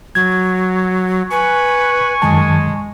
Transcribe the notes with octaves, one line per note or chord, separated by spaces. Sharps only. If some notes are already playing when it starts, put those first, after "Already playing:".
F#3 G#6
B4 G#5 C#6
F#2 D#3 G#3 A5